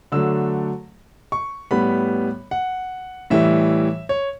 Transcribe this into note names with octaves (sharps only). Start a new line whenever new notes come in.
D3 F#3 A3 E6
C#6
A2 G3 B3 B5
F#5
A2 E3 G3 E5
C#5